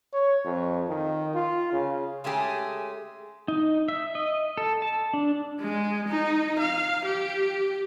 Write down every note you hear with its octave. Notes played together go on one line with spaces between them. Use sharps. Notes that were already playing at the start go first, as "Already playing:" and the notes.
C#5
F2
D#3
F4
C#3
G#3 A3 C#4 G4 G#4
D#4
E5
D#5
A4
A5
D4
G#3
D#4
F5
G4